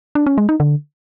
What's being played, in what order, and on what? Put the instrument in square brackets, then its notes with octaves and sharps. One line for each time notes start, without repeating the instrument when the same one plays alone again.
[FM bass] D4
C#4
G#3
D#4
D3